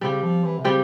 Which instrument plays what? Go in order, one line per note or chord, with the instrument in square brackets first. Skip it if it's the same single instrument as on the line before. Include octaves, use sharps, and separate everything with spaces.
[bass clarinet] C#3 [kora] G3 C4 G4
[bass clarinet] F3
E3
C3
[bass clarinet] C#3 [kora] G3 C4 G4